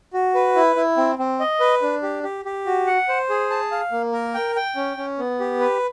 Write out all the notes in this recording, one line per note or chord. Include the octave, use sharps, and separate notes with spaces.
F#4
B4
E4
E4
C4
C4
D#5
B4
D4
G4
G4
G4
F#4
F#5
C5
G#4
A5
F5
A#3
A#4
G5
G5
C#4
C#4
B3
G4
B4